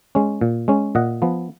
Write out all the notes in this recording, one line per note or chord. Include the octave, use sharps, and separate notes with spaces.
G#3 C#4
A#2
G#3 C#4
A#2 D#5 F#5
F3 B3